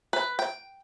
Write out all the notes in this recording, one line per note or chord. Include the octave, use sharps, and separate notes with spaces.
B4
G5